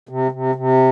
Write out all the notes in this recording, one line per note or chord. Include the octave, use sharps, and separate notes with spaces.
C3
C3
C3